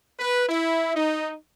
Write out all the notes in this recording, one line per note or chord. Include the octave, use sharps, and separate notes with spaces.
B4
E4
D#4